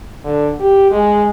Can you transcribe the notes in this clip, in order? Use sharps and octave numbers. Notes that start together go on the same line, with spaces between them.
D3
G4
G#3